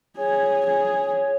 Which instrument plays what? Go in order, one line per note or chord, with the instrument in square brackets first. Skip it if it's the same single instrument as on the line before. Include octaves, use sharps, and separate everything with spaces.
[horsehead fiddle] G#4 [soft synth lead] C#5
[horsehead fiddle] G#4